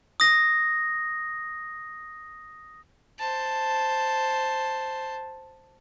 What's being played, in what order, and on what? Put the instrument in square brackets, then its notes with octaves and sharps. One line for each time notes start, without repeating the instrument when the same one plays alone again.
[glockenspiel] D#6 A#6
[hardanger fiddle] C5 A5